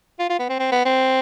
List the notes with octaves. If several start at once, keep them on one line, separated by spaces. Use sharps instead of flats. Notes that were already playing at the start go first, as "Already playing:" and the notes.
F4
F4
B3
C4
C4
B3
C4